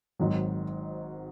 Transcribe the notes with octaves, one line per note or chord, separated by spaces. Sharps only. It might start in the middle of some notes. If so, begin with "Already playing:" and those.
G#1 G#2 D#3 F#3